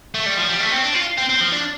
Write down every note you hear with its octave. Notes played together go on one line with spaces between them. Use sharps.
A3
G3
F3
G3
A3
C4
D4
F4
C4
C4
F3
D4